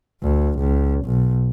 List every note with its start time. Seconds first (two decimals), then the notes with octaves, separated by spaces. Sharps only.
0.23 D2
0.59 C#2
1.06 B1